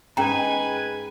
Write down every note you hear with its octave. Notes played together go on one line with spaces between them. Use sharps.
G#2 C#4 B4 G5 G#5 A#5